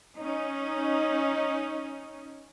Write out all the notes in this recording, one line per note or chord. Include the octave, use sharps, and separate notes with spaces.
C#4 D#4